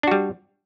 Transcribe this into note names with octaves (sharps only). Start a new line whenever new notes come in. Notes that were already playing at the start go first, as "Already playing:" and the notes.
G3 D4 F#4